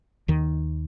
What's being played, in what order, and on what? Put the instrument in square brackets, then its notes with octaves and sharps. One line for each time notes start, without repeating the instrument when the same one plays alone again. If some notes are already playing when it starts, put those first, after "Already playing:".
[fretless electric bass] D#2 D#3